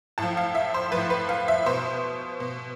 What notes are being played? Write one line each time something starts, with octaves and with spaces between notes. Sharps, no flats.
A2 F3 A5
F5
E5
C5
A2 F3 B4
B4
F5
E5
B2 C5
B2